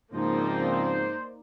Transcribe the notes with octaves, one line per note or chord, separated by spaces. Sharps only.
G#2 C#3 F3 A#3 C4 D#4 C5 D5